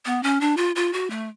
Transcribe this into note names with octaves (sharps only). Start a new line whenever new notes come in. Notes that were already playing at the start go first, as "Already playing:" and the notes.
B3
C#4
D4
F4
F4
F#4
A3